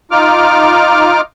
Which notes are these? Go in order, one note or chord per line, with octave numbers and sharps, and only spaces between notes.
D#4 F4 D6 F6